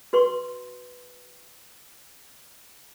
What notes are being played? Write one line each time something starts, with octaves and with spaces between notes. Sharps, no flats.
F#4 B4 C6 C#6